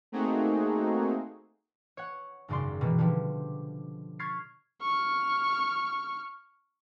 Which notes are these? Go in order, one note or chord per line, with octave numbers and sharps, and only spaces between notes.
A3 A#3 C4 D#4 F#4 G#4
C#5 F#5
G#1 F#2 C#3 D5 C6
B2 D#3 E3 G3
D3 F3 G3
C#6 F6 G#6 A6 B6 C7
C#6 F6